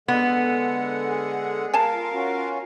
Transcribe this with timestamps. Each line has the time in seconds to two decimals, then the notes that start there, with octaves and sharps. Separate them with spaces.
0.08 D3 G#3 B3 F#5
1.09 G#4
1.74 A#4 F5 G#5 A5
1.94 F4
2.12 C#4 F4 F#4